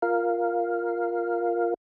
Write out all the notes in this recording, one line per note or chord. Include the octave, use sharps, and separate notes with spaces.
F4 A#4 F5